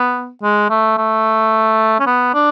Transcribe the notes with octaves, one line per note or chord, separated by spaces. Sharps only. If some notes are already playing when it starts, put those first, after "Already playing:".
Already playing: B3
G#3
A3
A3
C#4
B3
D4